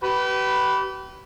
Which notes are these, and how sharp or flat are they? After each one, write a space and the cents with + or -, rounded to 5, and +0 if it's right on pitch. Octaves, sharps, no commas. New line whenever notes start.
G4 -40 B4 +0 B5 +0